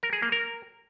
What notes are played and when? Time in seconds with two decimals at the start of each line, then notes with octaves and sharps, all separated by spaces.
0.03 A#4
0.13 G#4
0.22 A#3
0.32 A#4